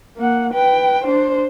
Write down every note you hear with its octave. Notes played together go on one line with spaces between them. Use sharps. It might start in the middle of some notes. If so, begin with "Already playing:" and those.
A#3 F#5
B4 G5
D4 C5